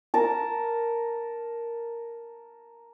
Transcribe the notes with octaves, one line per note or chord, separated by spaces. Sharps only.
A#4 A5